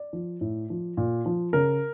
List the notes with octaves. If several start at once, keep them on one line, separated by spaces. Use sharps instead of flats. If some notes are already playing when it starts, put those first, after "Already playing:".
Already playing: D5
F3
A2
F3
A#2
F3
C#3 A#4